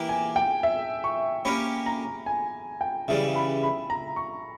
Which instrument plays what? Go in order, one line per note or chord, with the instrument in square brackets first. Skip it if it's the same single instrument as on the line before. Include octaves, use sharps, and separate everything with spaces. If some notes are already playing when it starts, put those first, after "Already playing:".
Already playing: [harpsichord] E3 A#3 E4 G4
[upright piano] G#5
G5
E5
C#6
[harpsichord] A#3 C#4 G4 C#5 [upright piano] B5
[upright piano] A#5
G#5
G5
[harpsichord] C#3 E3 G3 [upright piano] E5
[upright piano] B5
B5
A#5
C#6